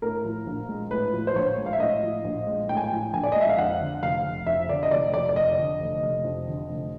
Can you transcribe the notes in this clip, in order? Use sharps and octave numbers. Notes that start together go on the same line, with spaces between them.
A2 A#4
F3
A#1
G#3
A2 B4
F3
C5
A#1 C#5
G#3
F5
E5
A2 D#5
F3
A#1
G#3
A2 G5
G#5
G5
F3
A#1 G#5
D5
G#3 D#5
E5
F5
F2 F#5
D3
F1 F5
F1
F2 E5
D3 D5
D#5
F1 D5
F1 D5
D5
F2 D#5
D3
F1
F1
F2
D3
F1